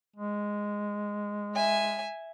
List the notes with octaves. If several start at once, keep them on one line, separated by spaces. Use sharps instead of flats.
G#3
E5 G#5